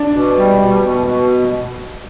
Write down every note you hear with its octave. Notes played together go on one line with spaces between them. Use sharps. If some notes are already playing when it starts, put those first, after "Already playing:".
Already playing: D4
B2
G3
B2
B2
B2